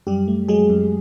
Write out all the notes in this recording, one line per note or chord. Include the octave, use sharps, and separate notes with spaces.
F#2 G3 G4
A3
F#3 G#3 G#4
F#2